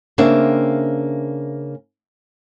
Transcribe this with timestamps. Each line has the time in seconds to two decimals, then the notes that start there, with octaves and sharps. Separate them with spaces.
0.18 C#3 A#3 C4 D4 E5